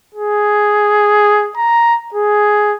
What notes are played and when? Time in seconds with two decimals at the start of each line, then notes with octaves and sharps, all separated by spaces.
0.15 G#4
1.57 A#5
2.14 G#4